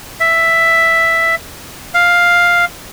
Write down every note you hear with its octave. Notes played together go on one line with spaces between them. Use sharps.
E5
F5